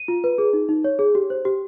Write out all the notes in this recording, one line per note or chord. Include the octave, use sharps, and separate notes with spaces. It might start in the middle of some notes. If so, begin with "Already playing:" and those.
Already playing: D#7
F4
B4
G#4
D#4
D#4
C#5
G#4
G4
C5
G4